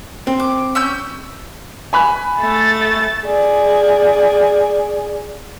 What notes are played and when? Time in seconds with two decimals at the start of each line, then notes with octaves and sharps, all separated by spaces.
0.27 C4
0.40 D6
0.75 C#4 E6 G6
1.93 G#5 B5 F#6
2.42 A3 A6
3.25 G#4 D5